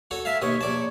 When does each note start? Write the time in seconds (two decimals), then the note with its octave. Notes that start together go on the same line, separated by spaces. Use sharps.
0.11 F#4 A4 C#5
0.25 E5 F5 A5
0.42 D#2 B2 C#5 D#6
0.61 A#1 D5 A5